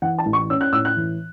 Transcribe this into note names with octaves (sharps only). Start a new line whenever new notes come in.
E3 F#5
A5
A1
C#6
C#4 E6
F#6
A2 E6
F#6
E3